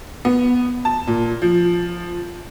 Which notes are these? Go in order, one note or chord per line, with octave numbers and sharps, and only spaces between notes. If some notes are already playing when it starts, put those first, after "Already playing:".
B3
A5
A#2
F3